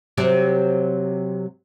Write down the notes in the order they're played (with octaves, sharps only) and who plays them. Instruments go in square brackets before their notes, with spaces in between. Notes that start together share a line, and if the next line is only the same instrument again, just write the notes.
[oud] C3 F#3 G4